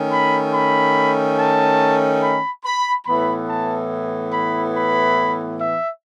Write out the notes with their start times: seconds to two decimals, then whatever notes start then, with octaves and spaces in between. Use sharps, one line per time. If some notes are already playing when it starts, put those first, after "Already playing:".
Already playing: D#3 A3 C#4
0.11 B5
0.54 B5
1.38 A5
2.22 B5
2.65 B5
3.06 A2 E3 B3 B5
3.48 A5
4.33 B5
4.75 B5
5.60 E5